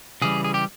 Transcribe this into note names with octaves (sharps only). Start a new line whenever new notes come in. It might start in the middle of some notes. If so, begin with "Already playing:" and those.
C#3 E3 G3 G#4
G#4
G4